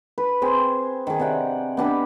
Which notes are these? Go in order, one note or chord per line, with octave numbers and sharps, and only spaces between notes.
B4
C4 G#4 C5
D#3 G#4
C3 D5 F#5 G5
B3 D4 G4 B4